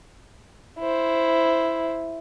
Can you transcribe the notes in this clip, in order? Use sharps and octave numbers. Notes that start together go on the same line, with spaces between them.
E4 C5